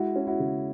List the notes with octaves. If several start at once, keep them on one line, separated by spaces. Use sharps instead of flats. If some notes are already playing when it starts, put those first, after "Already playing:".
Already playing: G#3 E4 F#4
C#4
E4 F#4
C#3